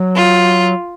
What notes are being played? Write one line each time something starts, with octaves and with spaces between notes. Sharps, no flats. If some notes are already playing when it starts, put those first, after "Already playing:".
Already playing: F#3
F4